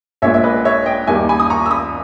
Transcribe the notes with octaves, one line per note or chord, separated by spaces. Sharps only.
A#1 A#2 G#3 C#5 E5
E5
B4 D#5
C#5 E5
D#5 G5
D#2 D#3 G3 E5 G#5
G#5 B5
D#6
A#5 C#6
E6
B5 D#6